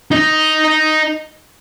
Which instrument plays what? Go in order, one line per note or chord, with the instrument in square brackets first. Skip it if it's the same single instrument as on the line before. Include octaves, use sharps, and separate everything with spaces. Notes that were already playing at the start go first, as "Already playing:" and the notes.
[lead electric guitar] D#4 D#5